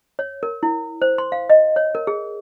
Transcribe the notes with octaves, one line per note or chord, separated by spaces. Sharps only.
C#5
A#4
E4
C5
C6
F5
D#5
C#5
A#4
G#4